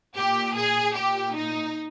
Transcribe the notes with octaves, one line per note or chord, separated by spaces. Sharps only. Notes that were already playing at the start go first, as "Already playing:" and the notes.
A#2 G4
G#4
A#2 G4
D#4